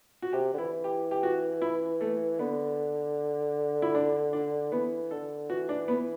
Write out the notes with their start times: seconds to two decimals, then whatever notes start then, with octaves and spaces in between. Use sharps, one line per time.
0.22 F#4
0.33 C3 G4
0.54 D3
0.58 E3 E4
0.84 G4
1.11 G4
1.23 F#4
1.62 E4
2.01 A3
2.39 D3 B3
3.82 E4
3.95 D4
4.33 D4
4.72 E3 B3
5.11 D3 A4
5.50 E3 F#4
5.69 D4
5.88 B3